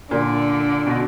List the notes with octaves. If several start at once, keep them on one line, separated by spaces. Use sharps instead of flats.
A#2 D3
B2